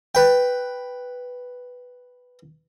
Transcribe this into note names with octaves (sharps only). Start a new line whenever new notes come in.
B4 G5